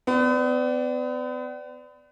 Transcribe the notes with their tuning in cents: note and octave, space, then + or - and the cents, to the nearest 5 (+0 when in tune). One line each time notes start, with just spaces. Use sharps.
B3 +40 D5 +0